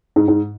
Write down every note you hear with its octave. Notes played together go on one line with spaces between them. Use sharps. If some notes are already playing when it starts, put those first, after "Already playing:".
G#2
G#2